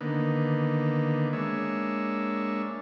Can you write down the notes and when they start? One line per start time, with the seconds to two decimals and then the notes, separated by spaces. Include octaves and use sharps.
0.01 D3 D#3 A#3 B3
1.33 G#3 A#3 D4 C#5 E5